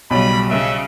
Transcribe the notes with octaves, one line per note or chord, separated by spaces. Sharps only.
B1 C#3 G3 B5
C#3 E5